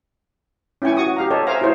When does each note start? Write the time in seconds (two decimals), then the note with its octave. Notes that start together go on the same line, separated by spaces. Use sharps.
0.82 C#4 E4 G5 G#5 C#6
0.97 F#4 C#6 D#6
1.16 G4 F5 A#5
1.31 A4 C#5 D#5
1.47 C5 E5 F5 G#5 A#5
1.61 E4 F#4 G#4 C5 C#5